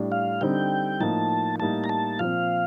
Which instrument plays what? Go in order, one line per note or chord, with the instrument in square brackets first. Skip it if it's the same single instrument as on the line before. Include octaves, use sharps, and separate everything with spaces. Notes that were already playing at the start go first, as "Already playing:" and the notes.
Already playing: [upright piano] A2 G3 D4
[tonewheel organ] F5
[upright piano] D3 G3 C4 D#4 [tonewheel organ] G5
[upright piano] A2 F3 A#3 D#4 [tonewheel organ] A5
[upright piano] A2 G3 A#3 D#4 [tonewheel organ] A5
[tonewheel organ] A#5
A5
[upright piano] A#2 F3 C4 [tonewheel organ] F5